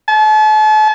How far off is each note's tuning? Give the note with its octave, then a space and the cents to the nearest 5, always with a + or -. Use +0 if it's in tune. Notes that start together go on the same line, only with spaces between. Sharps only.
A5 -40